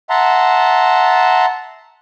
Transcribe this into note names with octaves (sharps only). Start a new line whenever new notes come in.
E5 F#5 A5 A#5 C6